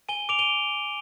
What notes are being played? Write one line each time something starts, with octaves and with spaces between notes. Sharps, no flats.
G#5 D#7 G7
D6 D7 F7
D#7 G7